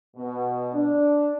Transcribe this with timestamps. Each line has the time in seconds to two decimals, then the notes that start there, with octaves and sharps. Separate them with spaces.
0.16 B2
0.73 D4